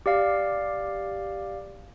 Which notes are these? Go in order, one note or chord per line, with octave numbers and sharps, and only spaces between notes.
G4 D5 F5